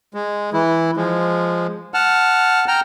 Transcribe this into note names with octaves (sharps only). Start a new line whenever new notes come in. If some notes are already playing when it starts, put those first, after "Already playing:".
G#3
E3 E4
F3 G#3
F#5 A5 F6
G5 A#5 F6